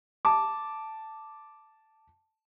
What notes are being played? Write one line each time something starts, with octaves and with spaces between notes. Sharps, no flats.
A5 D6